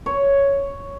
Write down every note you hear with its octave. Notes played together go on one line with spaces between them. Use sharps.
C#5